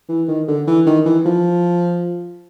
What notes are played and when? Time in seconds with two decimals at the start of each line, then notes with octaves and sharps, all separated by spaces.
0.09 E3
0.28 D#3
0.48 D3
0.67 E3
0.86 D#3
1.05 E3
1.26 F3